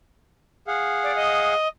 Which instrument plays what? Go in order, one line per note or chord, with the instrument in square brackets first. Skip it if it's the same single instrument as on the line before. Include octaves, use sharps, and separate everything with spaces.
[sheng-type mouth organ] G#4 F5 F#5
[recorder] D5
D#5